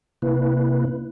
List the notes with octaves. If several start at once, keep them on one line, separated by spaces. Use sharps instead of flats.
C3 A#3 E4 B4